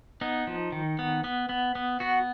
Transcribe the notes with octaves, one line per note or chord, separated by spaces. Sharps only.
B3 D#4
F3
D#3
B3
B3
B3
B3
B3 F#4